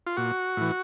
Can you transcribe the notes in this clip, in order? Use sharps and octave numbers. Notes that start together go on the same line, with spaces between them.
F4
A#2 F#4
A2 E3